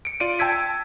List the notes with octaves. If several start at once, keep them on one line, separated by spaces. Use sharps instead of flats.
C#7 D7
F4 D5 D7 D#7
G5 A5 E6 G#6 B6
A5